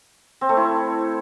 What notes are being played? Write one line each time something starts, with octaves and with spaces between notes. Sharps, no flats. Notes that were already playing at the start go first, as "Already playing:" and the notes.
C4
A3
E4